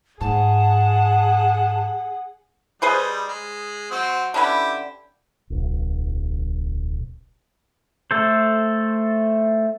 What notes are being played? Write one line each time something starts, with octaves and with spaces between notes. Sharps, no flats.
G#2 G#4 F#5 A5
G3 D#4 G#4 B4 C5
G#3
F#3 C4
D3 C#4 E4 G4 B4
D1 B1
A3 A4 C5